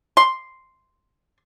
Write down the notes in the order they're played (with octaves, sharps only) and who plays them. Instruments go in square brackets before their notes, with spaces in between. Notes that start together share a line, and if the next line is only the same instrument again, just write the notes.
[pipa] C6